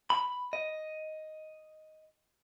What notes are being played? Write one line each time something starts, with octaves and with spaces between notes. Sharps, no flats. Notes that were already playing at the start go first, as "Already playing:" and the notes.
B5
D#5